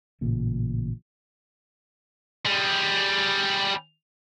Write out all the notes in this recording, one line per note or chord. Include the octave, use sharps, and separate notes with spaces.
A1 A#2 C#3
G3 G#4